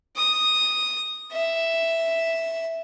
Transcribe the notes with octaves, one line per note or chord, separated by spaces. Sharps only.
D#6
E5